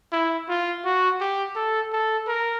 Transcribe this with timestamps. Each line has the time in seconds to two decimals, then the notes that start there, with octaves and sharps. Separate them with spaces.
0.12 E4
0.49 F4
0.85 F#4
1.21 G4
1.56 A4
1.93 A4
2.28 A#4